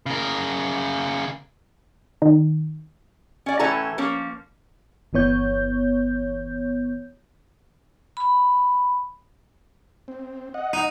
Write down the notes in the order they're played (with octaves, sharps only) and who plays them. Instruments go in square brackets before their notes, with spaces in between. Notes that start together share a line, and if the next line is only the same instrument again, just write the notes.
[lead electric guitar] C#3 A#4
[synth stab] D#3
[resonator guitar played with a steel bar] C#4 D5
A2 E3 C#4 A4 A#5
F3 A#3 C#4
[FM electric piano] G1 E3 B3 C#5 G6
[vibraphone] B5
[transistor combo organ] C4
D#5 F#5
[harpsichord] D#4